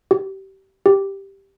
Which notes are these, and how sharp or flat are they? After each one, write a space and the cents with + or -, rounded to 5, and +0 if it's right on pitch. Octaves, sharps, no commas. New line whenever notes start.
G4 -25
G4 +0